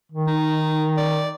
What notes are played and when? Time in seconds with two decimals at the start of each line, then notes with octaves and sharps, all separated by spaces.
0.12 D#3
0.27 D#4
0.97 D5